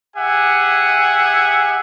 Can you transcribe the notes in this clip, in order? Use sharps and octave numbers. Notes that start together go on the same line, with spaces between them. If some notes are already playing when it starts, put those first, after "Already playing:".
G4 G#4 E5 F#5 G#5